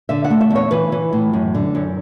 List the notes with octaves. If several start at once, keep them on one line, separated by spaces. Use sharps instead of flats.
D3 E5
F#5
A3
E5
E2
C#5
E3 B4
E3
A2
F#2
D3
F#2